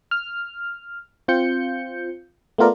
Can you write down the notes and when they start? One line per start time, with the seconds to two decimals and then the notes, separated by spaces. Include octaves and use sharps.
0.11 F6
1.28 C4 F4 G6 C#7
2.58 A3 B3 F4 A#4 D5